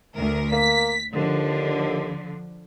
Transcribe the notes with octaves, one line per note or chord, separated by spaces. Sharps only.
D2 A#4
A#3 B6
D#2 D3 F3